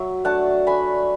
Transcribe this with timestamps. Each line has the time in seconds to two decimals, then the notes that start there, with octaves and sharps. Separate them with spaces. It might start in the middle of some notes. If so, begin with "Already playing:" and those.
Already playing: F#3 E5
0.24 A3 D4 F#5 A5
0.67 A3 D4 G#5 B5